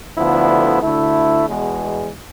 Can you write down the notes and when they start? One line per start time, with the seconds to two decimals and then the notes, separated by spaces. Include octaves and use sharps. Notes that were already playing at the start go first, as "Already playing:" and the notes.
0.16 D2 D3 F3 B3 E4
0.81 D2 D3 A3 E4
1.45 E2 B2 G#3